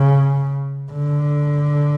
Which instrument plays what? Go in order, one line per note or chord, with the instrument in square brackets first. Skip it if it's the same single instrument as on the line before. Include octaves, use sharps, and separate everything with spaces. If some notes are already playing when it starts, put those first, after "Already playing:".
Already playing: [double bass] C#3
D3